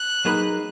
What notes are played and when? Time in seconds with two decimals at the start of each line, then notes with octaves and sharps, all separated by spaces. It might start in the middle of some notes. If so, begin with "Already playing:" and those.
Already playing: F#6
0.25 F#3 A#3 D#4 G#4 B4